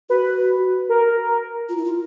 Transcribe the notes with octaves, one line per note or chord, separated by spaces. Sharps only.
F#4 B4
A#4
F4
E4
F4